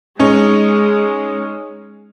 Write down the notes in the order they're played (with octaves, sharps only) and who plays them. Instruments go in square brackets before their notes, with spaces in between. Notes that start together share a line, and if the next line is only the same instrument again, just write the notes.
[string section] G#3 [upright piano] C#4 D#4